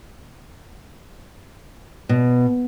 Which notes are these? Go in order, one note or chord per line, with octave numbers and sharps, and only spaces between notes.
B2